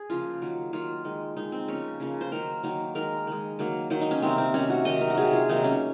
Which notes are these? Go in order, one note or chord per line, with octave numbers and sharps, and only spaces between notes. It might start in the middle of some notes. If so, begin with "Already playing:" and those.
Already playing: G#4
C#3 F3 A#3 F4
D#3 F#3 A#3
D#3 F#3 A#3 F4
D#3 G#3
D#3 G#3 D#4
C4
C#3 F3 A#3 C#4
C#3 F3 A#3
C5
D#3 F#3 A#3 A#4
D#3 F#3 A#3
D#3 G#3 A#4
D#3 G#3
D#3 F#3 A#3
D#3 F#3 A#3 C5
D#4
C#4
C3 D#3 A#3 C4
C4
C3 D#3 A#3 C#4
F#4
C3 D#3 F#3 D#5
A#4
F#4
C3 D#3 F#3 G#4
F4
C3 D#3 F#3 A#3 D#4
C#4